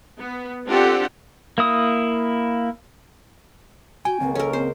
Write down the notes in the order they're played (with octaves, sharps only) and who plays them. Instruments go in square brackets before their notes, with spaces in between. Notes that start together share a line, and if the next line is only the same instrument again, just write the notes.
[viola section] B3
C4 D4 F4 G4 A4 F#5
[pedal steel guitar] A#3 E4 D#6
[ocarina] F#4 [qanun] G5 [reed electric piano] G#5
[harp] C#2 A#3 [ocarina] C4
[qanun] C#4 A#4 [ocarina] A4
[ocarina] C4 [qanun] C5